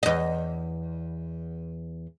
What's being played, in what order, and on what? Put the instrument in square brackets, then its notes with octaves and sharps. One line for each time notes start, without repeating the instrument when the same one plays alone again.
[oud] E2 D#5